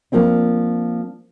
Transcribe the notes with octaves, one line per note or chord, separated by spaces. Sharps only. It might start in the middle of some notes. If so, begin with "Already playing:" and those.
F3 A#3 C4 D4